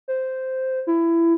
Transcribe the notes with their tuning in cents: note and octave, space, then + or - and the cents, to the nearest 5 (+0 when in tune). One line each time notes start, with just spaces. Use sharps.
C5 -5
E4 +20